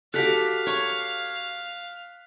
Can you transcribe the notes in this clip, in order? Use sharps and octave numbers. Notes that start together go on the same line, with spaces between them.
F#4 G4 A4 F5 F#6 B6
C#5 C#6